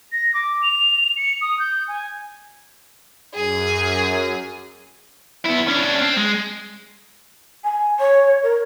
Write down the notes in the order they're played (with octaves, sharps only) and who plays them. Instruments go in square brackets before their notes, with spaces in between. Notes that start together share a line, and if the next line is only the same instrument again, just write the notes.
[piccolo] A#6
D6
F7
C#7
D#6
G6
G#5
[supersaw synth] F#2 [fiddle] G#4
[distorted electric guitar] B3 E4
C#4 D4
C4
G#3
[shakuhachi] G#5
C#5
A#4